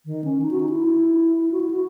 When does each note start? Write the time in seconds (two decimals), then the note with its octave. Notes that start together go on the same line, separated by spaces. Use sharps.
0.05 D#3
0.24 C#4
0.42 D#4
0.51 F#4
0.60 D#4
0.69 E4
1.51 F#4
1.61 E4
1.70 F#4